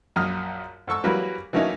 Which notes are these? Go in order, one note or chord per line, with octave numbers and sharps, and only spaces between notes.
A#1 F#2 D#6 F6
G#2 A4 C#6 E6
E3 F#3 G3 A#3 A#4 B4
E3 F#3 A3 A#3 C#4 D#4